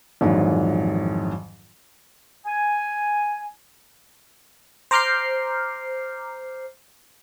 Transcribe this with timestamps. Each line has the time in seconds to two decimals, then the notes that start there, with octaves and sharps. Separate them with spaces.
0.21 A#1 F2 G#2 D#3 E3 F#3
2.46 G#5
4.91 C5 A#5 D6 F6 G6 C7